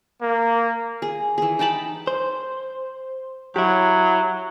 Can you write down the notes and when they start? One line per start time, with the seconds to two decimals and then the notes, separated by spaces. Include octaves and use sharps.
0.22 A#3
1.02 G#4
1.38 E3 G#4
1.59 D#4 G5 A5 B5
2.07 C5
3.56 F#3 E4 G4